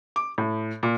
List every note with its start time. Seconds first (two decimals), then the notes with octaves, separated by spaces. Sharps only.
0.16 D6
0.38 A2
0.83 A#2